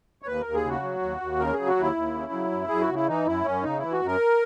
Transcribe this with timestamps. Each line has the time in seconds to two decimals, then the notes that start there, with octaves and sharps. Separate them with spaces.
0.22 C#5
0.27 D#2 B4
0.41 D#2 A#4
0.55 G#4
0.64 C#3 F#4
0.83 F#3
1.02 D#2
1.21 D#2
1.40 C#3 A#4
1.53 F#3 G#4
1.67 F#4
1.76 D#2 E4
1.96 D#2
2.14 C#3
2.32 F#3
2.52 F#2
2.69 F#2 G#4
2.82 F#4
2.90 C#3 E4
3.08 E3 D#4
3.26 F#2 E4
3.45 F#2 C#4
3.63 C#3 D#4
3.78 E3 E4
3.92 F#4
4.02 F#2 A#4